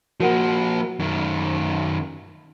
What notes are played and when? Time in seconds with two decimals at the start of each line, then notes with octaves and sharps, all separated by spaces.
0.20 F3 A#3 F#4 A#4 F#5
1.00 F#2 D#3